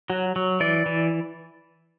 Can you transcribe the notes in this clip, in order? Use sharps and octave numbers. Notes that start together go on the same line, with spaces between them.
F#3 F#4
F#3
E3 D5
E3